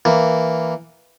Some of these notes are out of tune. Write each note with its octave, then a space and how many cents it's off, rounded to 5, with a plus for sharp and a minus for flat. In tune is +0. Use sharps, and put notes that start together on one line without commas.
E3 +0 A#3 +0